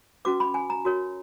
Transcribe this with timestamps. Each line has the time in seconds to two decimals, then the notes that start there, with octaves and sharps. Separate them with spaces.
0.25 C#4 F#4 B4 D6
0.40 B5
0.54 G#5
0.70 A#5
0.85 F#4 A#4 C#5